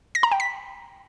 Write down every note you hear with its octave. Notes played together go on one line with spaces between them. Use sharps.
A#6
A#5
G5
B6